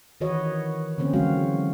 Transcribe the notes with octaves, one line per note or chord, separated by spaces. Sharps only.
D#3 E3 F#4 B4 C#5 D#5
D3 A#3 C4 C#4 C5
E3 F#3 G#3 F#4 F5